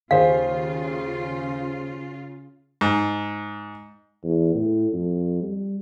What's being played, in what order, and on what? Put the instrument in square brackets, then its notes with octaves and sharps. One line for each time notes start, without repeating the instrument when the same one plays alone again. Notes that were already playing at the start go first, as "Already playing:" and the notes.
[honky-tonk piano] D#2 [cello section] C#3 F4 [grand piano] G#4 C5 [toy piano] F5
[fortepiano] G#2
[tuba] E2
A2
F2
G3